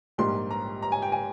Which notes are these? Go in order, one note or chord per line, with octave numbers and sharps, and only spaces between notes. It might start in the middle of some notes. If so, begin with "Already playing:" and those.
A#1 G#2 G3 A#3 C6
A#5
A#5
G#5
G5
G#5